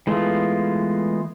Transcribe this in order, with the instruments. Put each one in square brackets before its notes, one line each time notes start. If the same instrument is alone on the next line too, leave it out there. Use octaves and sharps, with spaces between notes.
[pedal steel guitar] E3 G#3 A3 B3 F4